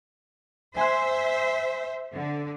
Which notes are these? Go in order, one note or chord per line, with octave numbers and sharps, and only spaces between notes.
C5 E5 G#5 C6 F#6
D3